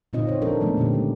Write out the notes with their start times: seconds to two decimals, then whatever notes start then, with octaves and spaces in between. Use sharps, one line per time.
0.13 A#2 D3 C4 D#4 F4 D#5
0.27 C#3 C5 C#5
0.41 F3 D4 A4 A#4
0.60 C#3 F3 G#3 A3 B3 C4
0.77 A#2 D3 F3 G4
0.93 D#3 G#3